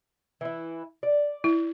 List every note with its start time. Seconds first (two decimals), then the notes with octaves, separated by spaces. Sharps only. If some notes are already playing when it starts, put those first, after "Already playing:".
0.41 E3 E4
1.03 D5
1.44 E4